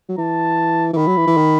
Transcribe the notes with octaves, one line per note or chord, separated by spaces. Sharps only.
F#3
E3 A5
E3
D#3 B5
F#3
E3
E3
D#3